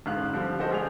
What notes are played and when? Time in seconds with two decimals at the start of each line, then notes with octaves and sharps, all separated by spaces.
0.06 A1 G#2 D3 F5 F#6
0.33 D3 F3 G3
0.59 F#4 G4 A4 C5 D#5
0.71 A1 G#4 D5 F7